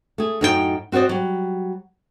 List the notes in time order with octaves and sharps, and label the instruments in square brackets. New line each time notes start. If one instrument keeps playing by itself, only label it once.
[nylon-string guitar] A3 G#4
F#2 A2 D#4 F#4 A4 G5
C4 F#4 C5 D5 D#5
F#3 G3